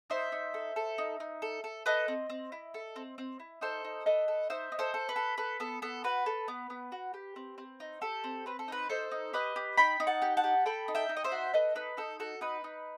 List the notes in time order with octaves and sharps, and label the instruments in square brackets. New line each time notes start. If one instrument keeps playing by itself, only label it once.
[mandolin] D#4 C5 E5
D#4
A4
A4
D#4
D#4
A4
A4
A4 B4 D#5
C4
C4
E4
A4
C4
C4
E4
D#4 A4 C5
D#4
A4 B4 D#5
A4
D#4 C5 E5
D#4
A4 C5
A4
B4
A4
A4 B4
B3 A4
B3 A4
F#4 B4
A4
B3
B3
F#4
G4
C4
C4
D#4
G4 A4
C4
C4 B4
A4
D#4 B4
D#4 A4 C5
D#4
G4 B4 D#5
G4
D#4 G5 B5
D#4
F#5 A5
G4
F#5 A5
G4
A4 G5 B5
D#4
E5 G5
D#4
D#5
C5 E5
F#4
A4 B4 D#5
D#4 B4
D#4 A4
F#4 A4
D#4 B4
D#4